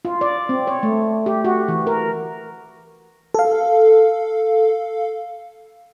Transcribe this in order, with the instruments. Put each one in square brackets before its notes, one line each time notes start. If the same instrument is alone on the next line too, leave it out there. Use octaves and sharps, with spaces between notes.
[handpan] F4
D5
C4
C#5
A3
G4
F#4
E3
A#4
[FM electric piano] A4 F5